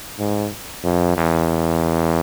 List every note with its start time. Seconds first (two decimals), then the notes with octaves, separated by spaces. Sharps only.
0.19 G#2
0.84 F2
1.17 E2